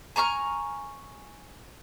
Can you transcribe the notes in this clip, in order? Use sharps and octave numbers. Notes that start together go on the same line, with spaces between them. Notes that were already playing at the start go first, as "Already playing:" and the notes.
G#5 A#5 C#6 F6